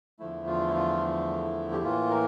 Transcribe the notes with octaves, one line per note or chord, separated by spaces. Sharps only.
E2 D3 F3 A3 E4
F4
E4
F4
E4
G4
A2 E3 A#3 F4
A#4